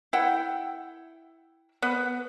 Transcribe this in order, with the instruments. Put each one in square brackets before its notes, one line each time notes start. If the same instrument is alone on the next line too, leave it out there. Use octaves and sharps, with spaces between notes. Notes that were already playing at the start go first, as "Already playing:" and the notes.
[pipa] E4 F#5 G5
B3